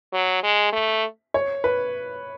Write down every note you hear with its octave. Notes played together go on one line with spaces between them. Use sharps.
F#3
G#3
A3
C#5
B4